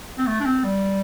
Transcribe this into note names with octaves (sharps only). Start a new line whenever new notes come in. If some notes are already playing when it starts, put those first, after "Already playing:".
C4
A3
D4
C4
G3